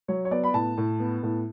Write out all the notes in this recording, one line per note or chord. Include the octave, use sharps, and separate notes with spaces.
F#3 C#5
C#5
B3 D5
B5
A2 A5
A2
B3
A2